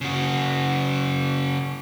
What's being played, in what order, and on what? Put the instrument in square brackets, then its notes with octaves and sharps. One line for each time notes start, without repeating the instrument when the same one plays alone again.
[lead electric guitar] C#3 F#4